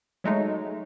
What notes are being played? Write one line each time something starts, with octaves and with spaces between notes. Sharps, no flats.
F#3 G#3 A3 D#4